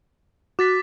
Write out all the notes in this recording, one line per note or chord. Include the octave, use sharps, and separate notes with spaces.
F#4 D6 A6 B6